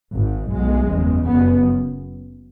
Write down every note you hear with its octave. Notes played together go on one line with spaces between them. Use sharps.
G#1 G#2
B1 B2 G#3
F#1 E2 C#3
F#1 F#2 C#3 B3